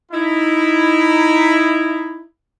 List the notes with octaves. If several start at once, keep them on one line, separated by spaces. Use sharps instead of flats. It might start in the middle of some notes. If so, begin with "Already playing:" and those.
D#4 E4